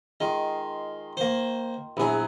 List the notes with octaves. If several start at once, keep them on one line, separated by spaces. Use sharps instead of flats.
D#3 G#3 F4
A#3 C5
A#1 F#3 B3 E4 G#4